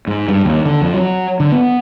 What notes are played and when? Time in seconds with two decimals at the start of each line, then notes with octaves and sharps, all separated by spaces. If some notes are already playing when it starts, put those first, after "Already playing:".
0.07 G#2
0.28 G2
0.45 D#2
0.66 D3
0.82 F2
0.94 F#3
1.40 D3
1.52 B3